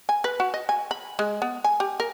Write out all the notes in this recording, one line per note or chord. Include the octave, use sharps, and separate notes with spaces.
G#5
B4
F#4
D#5
G#5
B5
G#3
B3
G#5
G4
A#4